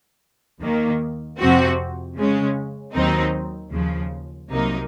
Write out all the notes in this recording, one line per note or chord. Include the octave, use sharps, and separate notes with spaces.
D#2 D#3 A#3
F2 C3 F3 C4 F#4
C#3 G#3 C#4
D#2 D#3 F#3 C4 D#4
D#2 C#3 F3
C2 C3 F#3 A#3 D#4